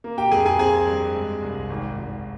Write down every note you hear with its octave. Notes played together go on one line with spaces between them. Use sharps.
A#3
G4 G5
F2 G#4 G#5
G#4 G#5
C4 G#4 G#5
G2
G#3
C2
G#1
G#1